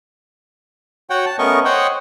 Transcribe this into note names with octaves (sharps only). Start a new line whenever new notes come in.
F#4 C#5 F#5 G5
A5
A3 B3 C#4 A#4 D#5 C#6
C5 C#5 D#5 F#5 G5